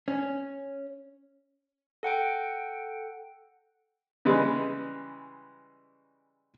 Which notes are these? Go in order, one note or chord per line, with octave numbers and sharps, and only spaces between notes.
C#4
A4 F#5 G5 D7
C#3 E3 G3 G#3